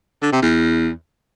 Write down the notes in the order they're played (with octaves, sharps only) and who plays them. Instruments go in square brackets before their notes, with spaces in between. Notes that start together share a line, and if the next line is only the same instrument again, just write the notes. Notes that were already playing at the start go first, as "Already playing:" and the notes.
[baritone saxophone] D3
C3
E2